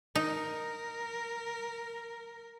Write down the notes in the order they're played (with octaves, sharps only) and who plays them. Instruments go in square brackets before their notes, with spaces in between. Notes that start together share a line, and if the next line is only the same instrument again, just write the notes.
[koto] D#4 [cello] A#4